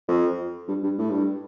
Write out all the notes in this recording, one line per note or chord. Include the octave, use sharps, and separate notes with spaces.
F2
G2
G2
A2
G2